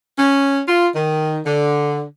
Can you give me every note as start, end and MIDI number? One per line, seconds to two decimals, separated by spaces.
0.17 0.61 61
0.68 0.88 65
0.95 1.39 51
1.45 2.01 50